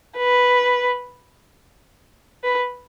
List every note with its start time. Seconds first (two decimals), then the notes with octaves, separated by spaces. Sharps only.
0.18 B4
2.44 B4